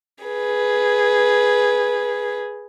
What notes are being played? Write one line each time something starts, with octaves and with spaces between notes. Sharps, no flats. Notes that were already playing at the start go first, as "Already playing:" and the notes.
G#4 B4